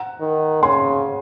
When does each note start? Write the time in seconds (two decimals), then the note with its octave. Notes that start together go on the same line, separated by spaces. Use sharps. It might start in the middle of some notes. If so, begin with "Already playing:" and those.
Already playing: F#5 A#5
0.21 D#3
0.63 C#3 G#5 C6